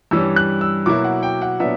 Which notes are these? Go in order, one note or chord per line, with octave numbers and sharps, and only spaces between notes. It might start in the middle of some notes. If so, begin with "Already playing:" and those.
G2 E3 G3 C#4 E6
F#6
E6
B2 F#3 A#3 E4 D6
F#5
G5
F#5
A#2 F#3 B3 D4 E5